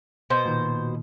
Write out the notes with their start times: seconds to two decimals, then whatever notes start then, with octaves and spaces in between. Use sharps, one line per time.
0.30 B2 C5
0.46 A#2 D#3